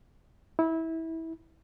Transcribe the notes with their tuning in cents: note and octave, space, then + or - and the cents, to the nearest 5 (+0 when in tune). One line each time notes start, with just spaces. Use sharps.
E4 -20